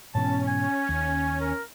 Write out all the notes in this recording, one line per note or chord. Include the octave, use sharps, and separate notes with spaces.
G#2 B2 E3 C#4 A5
G#5
D#2
A#4